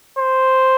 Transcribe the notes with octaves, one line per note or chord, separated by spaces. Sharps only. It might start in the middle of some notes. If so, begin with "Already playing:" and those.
C5